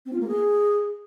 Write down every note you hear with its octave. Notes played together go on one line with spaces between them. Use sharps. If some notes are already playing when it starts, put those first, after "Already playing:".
C4
F4
A#3
G#4